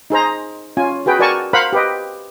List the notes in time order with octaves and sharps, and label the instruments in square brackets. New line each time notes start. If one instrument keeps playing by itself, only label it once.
[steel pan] D#4 G#4 C5 A#5
C#4 F4 G#5
F#4 G#4 B4 G5
F#4 A#4 D5 G#5 A5 C#6
A#4 C5 F5 F#5 B5
G4 B4 D#5